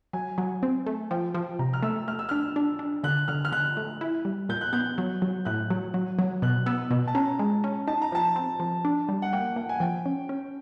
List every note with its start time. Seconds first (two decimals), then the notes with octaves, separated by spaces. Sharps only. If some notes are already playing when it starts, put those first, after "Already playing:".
0.13 F#3 G#5
0.38 F#3
0.63 C4
0.86 A3
1.11 F3 G5
1.34 F3
1.59 C3 A#5
1.73 F6
1.83 A3 E6
2.08 A3 F6
2.19 E6
2.29 D4 F6
2.56 D4
2.79 D4
3.04 D3 F#6
3.28 D3 F6
3.45 F6
3.52 D3 F#6
3.77 A3
4.01 E4
4.25 G3
4.49 A#2 G6
4.61 F#6
4.73 B3 G6
4.98 F#3
5.22 F#3
5.45 A2 F#6
5.70 F#3
5.94 F#3
6.19 F#3
6.42 B2 F#6
6.66 B3 E6
6.91 B2
7.07 A5
7.15 C#4 A#5
7.39 G#3
7.64 C#4
7.87 D#4 A5
8.02 A#5
8.12 F3 A5
8.36 C4
8.60 F3
8.85 D4
9.09 G3
9.22 F#5
9.33 A#3 G5
9.56 A#3 F#5
9.69 G#5
9.80 F3 G5
10.06 C#4
10.29 C#4